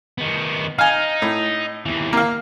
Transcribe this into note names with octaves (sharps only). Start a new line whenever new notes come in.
D#3 B3
D#4 F5 G#5
A2
D#2 E3
A#3 F5